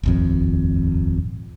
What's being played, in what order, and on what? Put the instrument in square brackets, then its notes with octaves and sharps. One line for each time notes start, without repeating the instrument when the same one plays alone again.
[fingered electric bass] D#1 G#1 F2